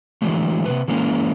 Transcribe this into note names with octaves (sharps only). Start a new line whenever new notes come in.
D3 E3 F#3 G#3 A3
C3 D#3 B4
E3 G#3 A#3 C#4